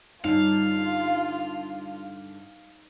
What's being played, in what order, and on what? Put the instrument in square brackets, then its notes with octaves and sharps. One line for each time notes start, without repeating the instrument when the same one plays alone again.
[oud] G2 D3 C#4 [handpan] G3 D#4 [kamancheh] F4 [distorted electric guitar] F5